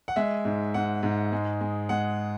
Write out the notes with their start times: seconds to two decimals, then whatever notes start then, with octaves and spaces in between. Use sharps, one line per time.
0.08 F#5
0.16 G#3 E5
0.45 G#2
0.74 G#2 F#5
1.03 G#2
1.32 G#3
1.61 G#3
1.89 G#3 F#5